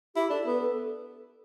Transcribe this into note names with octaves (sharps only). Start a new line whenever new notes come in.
E4 G4
D4 A4
B3 B4
A4